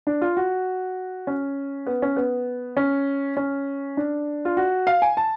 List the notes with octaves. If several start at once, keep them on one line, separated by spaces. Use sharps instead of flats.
D4
F4
F#4
C#4
B3
C#4
B3
C#4
C#4
D4
F4
F#4
F5
G#5
A5